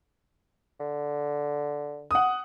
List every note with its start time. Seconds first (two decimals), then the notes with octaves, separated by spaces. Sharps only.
0.80 D3
2.11 F#5 D#6